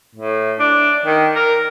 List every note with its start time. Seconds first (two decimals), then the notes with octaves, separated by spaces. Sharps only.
0.15 A2
0.59 D4
1.05 D#3
1.36 A#4